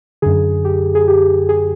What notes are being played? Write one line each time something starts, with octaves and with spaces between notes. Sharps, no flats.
F#2 D3 G#4
G4
G#4
G4
G#4